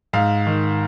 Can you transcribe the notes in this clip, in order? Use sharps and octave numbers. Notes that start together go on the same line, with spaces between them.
G#2 F5
D#3